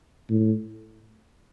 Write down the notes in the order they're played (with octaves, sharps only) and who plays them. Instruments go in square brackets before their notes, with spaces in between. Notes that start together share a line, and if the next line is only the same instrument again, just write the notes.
[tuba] A2